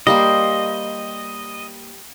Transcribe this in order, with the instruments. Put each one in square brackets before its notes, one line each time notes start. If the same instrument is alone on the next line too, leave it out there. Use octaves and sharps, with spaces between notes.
[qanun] G3 A#3 C5 [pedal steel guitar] D#5